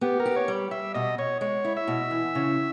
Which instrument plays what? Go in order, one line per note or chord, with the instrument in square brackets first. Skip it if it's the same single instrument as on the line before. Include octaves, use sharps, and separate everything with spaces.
[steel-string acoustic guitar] B3 [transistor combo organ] G4
[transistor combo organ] A#4
[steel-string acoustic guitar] G4
[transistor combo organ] C#5
[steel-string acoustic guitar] G3
[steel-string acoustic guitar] G3 [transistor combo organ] E5
[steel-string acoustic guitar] B2 [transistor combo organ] D#5
[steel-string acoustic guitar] B2 [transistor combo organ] C#5
[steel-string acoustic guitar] G#3 [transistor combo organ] C#5
[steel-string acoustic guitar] E4
[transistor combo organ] E5
[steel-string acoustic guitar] B2
E3
C#3